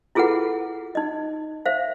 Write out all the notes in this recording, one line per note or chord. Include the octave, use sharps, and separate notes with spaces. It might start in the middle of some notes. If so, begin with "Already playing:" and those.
E4 F4 G#4 A4 B4 F#5
D#4 D#5
C5 E5 F5